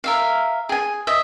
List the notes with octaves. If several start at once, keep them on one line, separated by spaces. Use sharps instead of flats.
A#4 E5 F5
G#4 G#5
D#5 E5